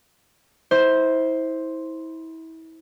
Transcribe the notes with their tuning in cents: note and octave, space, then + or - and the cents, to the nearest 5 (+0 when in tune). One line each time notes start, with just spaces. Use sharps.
E4 -30 C5 +5